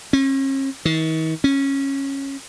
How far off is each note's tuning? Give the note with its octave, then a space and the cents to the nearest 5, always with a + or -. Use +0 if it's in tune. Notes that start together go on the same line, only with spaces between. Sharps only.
C#4 -45
D#3 +45
C#4 -15